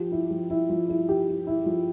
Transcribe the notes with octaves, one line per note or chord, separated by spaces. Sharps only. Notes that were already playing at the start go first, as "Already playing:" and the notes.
Already playing: F3 G4
E4
F3
E4
F3
E4
G4
E4
E4
F3